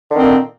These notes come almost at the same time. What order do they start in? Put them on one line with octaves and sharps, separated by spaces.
D3 D#3 C4 A#2